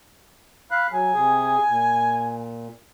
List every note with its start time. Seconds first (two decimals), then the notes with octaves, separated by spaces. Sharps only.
0.71 F5 B5 F#6
0.92 F#3 G#5
1.14 C3 G#4
1.68 A#2